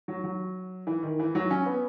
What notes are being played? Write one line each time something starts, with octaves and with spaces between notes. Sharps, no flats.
F#3
F#3
E3
D#3
E3
F#3
C#4
B3